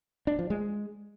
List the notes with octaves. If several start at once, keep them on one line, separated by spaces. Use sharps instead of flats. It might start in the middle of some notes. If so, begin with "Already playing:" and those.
D4
F3
G#3